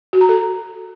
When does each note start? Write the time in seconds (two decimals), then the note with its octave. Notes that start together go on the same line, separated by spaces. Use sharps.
0.13 F#4
0.21 A#5
0.29 A4